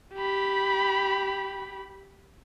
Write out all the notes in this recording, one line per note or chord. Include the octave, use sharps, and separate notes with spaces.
G4 B5